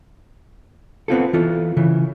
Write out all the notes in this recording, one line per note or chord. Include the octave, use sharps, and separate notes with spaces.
B3 C4 F4 A4
E3 F4 A4
C#3 E3